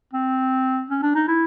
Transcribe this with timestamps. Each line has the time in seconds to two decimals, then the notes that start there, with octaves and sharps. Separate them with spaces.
0.13 C4
0.90 C#4
1.03 D4
1.15 D#4
1.28 E4